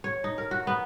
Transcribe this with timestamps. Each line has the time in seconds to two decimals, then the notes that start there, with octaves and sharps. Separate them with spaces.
0.04 C#5
0.24 D#4
0.38 A#4
0.51 F#4
0.67 B3